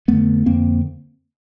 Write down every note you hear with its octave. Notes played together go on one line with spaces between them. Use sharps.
F2 D3 A3 B3
F2 D3 A#3 C4